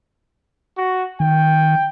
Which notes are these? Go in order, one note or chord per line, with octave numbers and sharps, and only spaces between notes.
F#4
D#3 G5